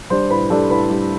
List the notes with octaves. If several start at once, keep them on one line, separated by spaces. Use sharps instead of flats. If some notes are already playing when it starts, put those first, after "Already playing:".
G3 D4 C5 C6
A2 B4 B5
G3 D4 A4 A5
A2 B4 B5
G3 D4